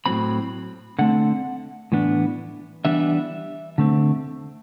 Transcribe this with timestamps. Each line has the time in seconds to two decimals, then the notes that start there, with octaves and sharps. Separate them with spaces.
0.06 A2 F#3 C4 B5
0.99 D3 A3 C4 F#5
1.92 A2 E3 B3 D4
2.85 E3 G3 B3 D4 E5
3.78 D3 A3 C4